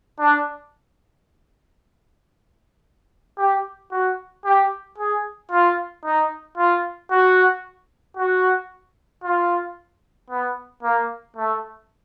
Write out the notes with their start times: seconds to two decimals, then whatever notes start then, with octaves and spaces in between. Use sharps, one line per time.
0.19 D4
3.38 G4
3.91 F#4
4.45 G4
4.98 G#4
5.51 F4
6.05 D#4
6.57 F4
7.11 F#4
8.17 F#4
9.23 F4
10.30 B3
10.83 A#3
11.36 A3